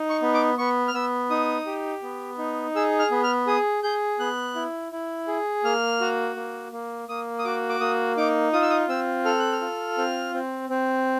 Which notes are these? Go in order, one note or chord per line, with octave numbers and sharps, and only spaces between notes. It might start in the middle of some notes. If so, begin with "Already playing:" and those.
Already playing: D#4
C#6
B3
D6
B3 C#6
F6
B3 E6
D#4 D#6
G4
B3
D#4
G#4 E6
F6
B3
F6
G#4 D#6
G#4 G6
B3 F#6
E4
E4
G#4
A#3 F6
F#4
A#3
A#3
A#3 D#6
D#6
F#4 D6
D6
A#3 D#6
D#4 D6
F4 D#6
E6
D#6
C4 E6
A4 F6
F#6
F6
F4
C4
C4
C4